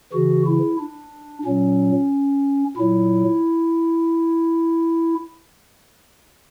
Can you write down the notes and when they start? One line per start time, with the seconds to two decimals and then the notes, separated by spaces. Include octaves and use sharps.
0.13 C#3 E3 F#4
0.47 E4
0.79 D4
1.45 A#2 F#3 C#4
2.77 A#2 F#3 E4